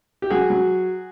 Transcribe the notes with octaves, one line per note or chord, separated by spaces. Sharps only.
G4
F#3 F#4 G#4
F#3